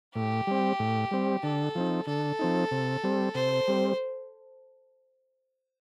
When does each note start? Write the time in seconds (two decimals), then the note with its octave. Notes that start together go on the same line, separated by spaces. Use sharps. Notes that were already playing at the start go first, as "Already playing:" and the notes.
0.15 A2 G4
0.47 G3 C4
0.79 A2
1.11 G3 C4
1.43 D3 A4
1.75 F3 C4 D#4
2.07 D3 A4
2.39 F3 C4 D#4
2.71 C3
3.04 G3 C4
3.35 C3 C5
3.68 G3 C4